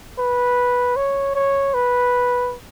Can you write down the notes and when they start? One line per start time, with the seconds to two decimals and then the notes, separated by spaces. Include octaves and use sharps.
0.18 B4
0.96 C#5
1.35 C#5
1.74 B4